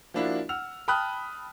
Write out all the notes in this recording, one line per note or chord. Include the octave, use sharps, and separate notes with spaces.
F3 A#3 D4 E4 F#4
F#5 E6 F6 F7
G5 A5 B5 D#6 F6 F#6